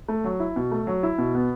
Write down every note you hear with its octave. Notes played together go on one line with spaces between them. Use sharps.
A3
F#3
E4
B2
A3
F#3
E4
B2
B3